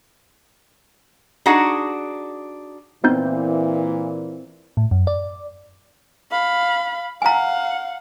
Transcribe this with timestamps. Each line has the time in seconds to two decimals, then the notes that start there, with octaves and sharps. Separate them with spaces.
1.46 D4 D#4 F#4 G#4 F#5
3.04 A#2 E3 B3 C4 D#4 G6
4.77 A2
4.91 F#2
5.07 D5
6.31 F5 B5
7.22 F5 F#5 G#5 A#5